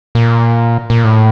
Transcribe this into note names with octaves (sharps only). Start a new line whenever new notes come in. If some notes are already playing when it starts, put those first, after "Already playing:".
A#2
A#2
A2